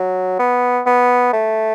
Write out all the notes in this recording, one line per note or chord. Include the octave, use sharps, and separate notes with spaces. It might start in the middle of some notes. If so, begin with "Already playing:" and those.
Already playing: F#3
B3
B3
A3